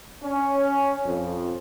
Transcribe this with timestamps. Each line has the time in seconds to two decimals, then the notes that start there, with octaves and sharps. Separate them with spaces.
0.23 C#4
1.04 F2